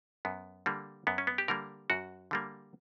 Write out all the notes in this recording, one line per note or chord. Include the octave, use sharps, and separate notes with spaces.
F#2 B3
D3 G3 A#3
F#2 B3
C#4
B3
G4
D3 G3 A#3 A#4
F#2 F#4
D3 G3 A#3